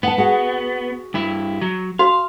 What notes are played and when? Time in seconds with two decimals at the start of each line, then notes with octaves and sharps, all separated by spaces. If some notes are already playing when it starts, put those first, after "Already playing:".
0.03 B3 F#5 G5 A5
0.18 F#4 G#4 F#5
1.14 G2 E4
1.61 F#3
1.99 F#4 F5